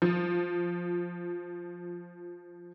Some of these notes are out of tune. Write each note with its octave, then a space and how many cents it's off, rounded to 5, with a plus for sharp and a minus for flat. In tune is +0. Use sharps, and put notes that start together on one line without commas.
F3 +5